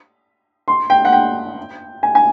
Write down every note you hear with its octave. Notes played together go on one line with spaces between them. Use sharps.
C6
G5
F#5
G5
G#5
G#5